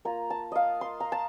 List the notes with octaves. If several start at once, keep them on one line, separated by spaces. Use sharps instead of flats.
A#3 F4 A#5
A5
D#5 F5
C6
A#5
A5